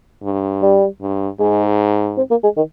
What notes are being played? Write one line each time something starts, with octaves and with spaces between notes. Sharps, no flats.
G2
G3
G2
G#2 G#3
C4
A#3
G#3
D#3